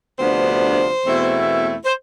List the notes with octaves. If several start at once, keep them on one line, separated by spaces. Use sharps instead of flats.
D2 C3 F3 B3 D4 C5
E2 B2 A3 C4 E4
C5